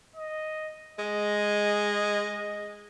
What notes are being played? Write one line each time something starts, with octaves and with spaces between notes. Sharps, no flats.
D#5
G#3 D#5